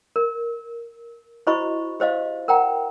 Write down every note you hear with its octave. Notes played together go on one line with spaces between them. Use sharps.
A#4
E4 F#4 C5 D#5 B5 C#6
G4 C5 D#5 F5
A#4 F#5 G5 A#5